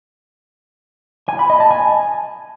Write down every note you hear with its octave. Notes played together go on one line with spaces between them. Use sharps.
G#5
B5
D#5
A5
G#5